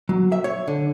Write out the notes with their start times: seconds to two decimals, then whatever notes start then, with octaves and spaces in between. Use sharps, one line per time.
0.09 F#3
0.32 E5
0.44 C#5
0.68 D3